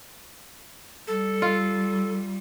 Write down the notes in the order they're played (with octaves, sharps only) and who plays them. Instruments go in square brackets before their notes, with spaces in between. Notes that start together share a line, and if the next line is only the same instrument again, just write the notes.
[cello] G3 [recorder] A4
[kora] F4